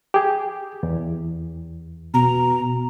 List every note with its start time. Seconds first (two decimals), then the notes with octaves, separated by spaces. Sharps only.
0.14 G4 G#4
0.83 E2
2.14 B2 A#5